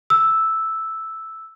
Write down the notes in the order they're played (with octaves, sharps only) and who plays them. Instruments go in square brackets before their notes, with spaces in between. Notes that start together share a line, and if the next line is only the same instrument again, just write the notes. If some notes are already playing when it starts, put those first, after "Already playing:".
[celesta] E6